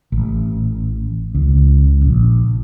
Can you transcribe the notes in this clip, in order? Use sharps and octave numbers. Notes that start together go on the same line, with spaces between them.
A1
C#2
A#1